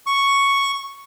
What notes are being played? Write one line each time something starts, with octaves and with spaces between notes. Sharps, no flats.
C#6